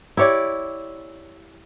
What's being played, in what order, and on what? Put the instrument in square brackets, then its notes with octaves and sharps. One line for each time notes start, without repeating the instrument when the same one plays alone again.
[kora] E4 G4 C#5 D5